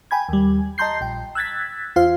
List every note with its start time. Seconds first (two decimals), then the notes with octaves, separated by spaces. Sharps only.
0.11 G5 G#5 B5 G#6
0.29 D#2 G3
0.78 D#5 A5 A#5 C6 G6 C7
1.01 A#1 G5
1.35 E6 F#6 G#6 A6 B6
1.96 E2 F4 C5 F5